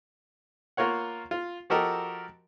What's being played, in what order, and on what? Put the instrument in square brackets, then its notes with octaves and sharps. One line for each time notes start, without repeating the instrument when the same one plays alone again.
[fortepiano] A#3 F4 A#4 C#5 F#5
F4
F3 F#4 G4 A4 A#4 D#5